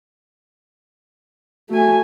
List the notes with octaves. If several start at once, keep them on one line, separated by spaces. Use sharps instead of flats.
A3 F#4 G#5